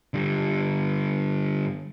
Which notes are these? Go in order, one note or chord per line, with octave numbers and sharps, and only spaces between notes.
D3 G3